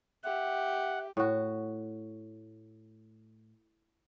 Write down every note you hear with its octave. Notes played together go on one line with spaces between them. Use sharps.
G4 E5 F#5
A2 F#4